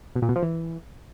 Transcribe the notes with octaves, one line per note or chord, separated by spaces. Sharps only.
B2
A#2
B2
F3
E3